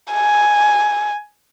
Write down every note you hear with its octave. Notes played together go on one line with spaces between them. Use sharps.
G#5